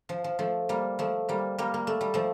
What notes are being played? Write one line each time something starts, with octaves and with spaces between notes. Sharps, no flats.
F3
F3
F3 A3
G3 A#3
F3 A3
G3 A#3
G3 A#3
A#3
A3
G3
F3 A3